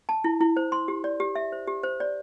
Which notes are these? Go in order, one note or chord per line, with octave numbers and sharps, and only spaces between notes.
A5
E4
E4
C5
C6
G4
D5
G4
E5
C5
G4
C5
D5